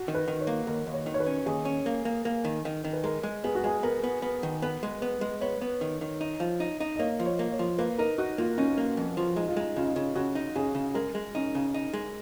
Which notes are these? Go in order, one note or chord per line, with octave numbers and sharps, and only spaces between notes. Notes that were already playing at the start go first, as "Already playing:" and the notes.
Already playing: F#4
D#3
B4
D#3
C#5
A#3
D#2 A#4
D#2
C#5
D#3
C#5
B4
C#4
D#2 G#4
C#4
A#3
A#3
A#3
D#3
D#3
D#3
B4
G#3 A#4
G#3
B3 G#4
F#4
G#3 G#4
B3 A#4
B3
B3
D#3
B3 B4
G#3
B3
G#3
B3 C#5
B3
D#3
D#3
D#4
F3
D#4
D#4
D#5
A#3 C#5
F3
C#5
A#3
C#5
F3
A#3 B4
D#4 A#4
D#4 F#4
A#3 F4
C#4 D#4
A#3
F2
F3
G#3 D#4
F4
G#3 D#4
C#3 F4
D#4
C#3 F4
C#3 F#4
D#4
C#3 G#4
C#3
G#3 A#4
G#3
C#4 D#4
C#3
D#4
G#3